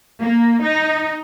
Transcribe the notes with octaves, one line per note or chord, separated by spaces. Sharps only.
A#3
D#4